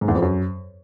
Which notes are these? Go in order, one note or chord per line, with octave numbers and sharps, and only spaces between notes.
G#2
E2
F2
F#2